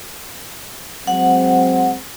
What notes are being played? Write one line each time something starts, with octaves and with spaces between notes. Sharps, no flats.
F#3 G#3 C4 F#5